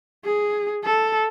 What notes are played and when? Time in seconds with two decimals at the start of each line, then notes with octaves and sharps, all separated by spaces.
0.25 G#4
0.85 A4